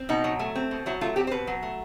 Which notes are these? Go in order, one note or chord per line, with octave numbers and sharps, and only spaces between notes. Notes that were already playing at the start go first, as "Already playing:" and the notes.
Already playing: C4
B2 D#4
F#3
A3
C4
B2
F#3 E4
A3 F4
C4 G4
C5
B2 B4
F#3
A3